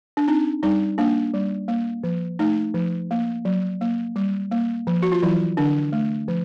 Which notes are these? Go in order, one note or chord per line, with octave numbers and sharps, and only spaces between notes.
D4
C4 D#4
G3 D#4
A#3 D4
G3
A#3
F3
A3 D#4
F3
A#3
F#3
A#3
G3
A#3
F3
F#4
F4
E3 F#3 E4
D3 D4
A3
F3